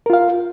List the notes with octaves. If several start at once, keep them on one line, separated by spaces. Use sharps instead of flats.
F4 A#4 F5